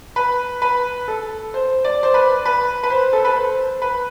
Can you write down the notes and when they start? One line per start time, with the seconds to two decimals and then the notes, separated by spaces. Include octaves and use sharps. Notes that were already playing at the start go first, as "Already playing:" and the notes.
0.16 B4
0.62 B4
1.08 A4
1.54 C5
1.85 D5
2.03 C5
2.14 B4
2.45 B4
2.83 B4
2.90 C5
3.13 A4
3.25 B4
3.36 C5
3.82 B4